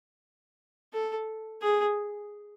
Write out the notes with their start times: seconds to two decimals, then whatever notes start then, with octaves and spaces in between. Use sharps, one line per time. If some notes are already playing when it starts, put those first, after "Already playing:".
0.93 A4
1.62 G#4